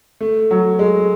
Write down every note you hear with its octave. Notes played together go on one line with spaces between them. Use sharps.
A3
F#3
G#3